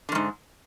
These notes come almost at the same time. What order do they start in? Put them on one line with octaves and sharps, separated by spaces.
D3 F2 G#2